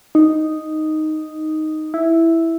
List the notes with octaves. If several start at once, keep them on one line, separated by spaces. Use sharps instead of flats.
D#4
E4